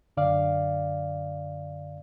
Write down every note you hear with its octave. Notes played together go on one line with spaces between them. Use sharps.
F#2 D3 D5 F5